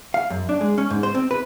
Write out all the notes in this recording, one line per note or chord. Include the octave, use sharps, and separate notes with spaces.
F5
F#2
D4
G#3
C#4
G#2
C5
C4
B4